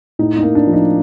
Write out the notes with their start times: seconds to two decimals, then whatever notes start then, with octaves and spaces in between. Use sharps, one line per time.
0.19 A2 D#4
0.37 D#4
0.43 A#3
0.55 D4
0.67 F3
0.73 D#4